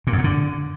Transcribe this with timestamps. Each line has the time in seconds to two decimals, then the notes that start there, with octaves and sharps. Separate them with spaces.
0.07 A#2
0.13 F#2
0.18 A#2
0.24 D3